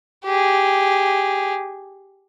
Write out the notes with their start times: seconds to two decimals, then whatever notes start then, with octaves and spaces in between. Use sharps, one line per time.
0.25 G4 G#4